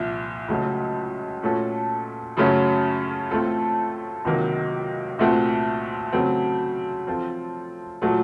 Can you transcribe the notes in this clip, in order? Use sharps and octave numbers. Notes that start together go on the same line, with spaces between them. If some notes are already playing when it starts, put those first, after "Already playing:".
Already playing: C2 A#2 F3
C#2 C#3 F#3 A3
A#2 A3 C#4 F#4 A4
F#2 C#3 F#3 A3 C#4
A2 A3 C4 F4 A4
C#2 C3 D#3 F#3 A#3
C2 A#2 A3 C4 F#4
C#3 F#3 A3 C4
F3 C4 F4 A4
A#2 F#3 A3